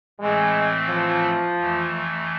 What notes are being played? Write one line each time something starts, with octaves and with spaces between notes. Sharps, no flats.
A2 E3 G#3 A3 C4
F3
F2 E3 A3